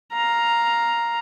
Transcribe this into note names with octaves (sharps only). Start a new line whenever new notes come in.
F5 A#5